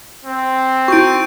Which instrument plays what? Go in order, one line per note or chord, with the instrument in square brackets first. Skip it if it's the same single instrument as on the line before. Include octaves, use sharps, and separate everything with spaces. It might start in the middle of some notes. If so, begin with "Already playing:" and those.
[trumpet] C4
[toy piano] E4 F#4 [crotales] C#6 G6 D7